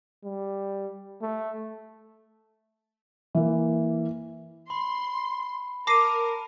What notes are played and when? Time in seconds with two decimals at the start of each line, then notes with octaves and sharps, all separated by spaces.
0.25 G3
1.22 A3
3.35 E3 A#3
4.70 B5 C6
5.87 A#4 A5 D6 A#6 C7 D#7